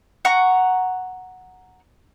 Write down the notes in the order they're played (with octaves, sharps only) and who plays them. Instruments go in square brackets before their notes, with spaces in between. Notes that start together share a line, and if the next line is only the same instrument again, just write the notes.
[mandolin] F#5 A#5 C#6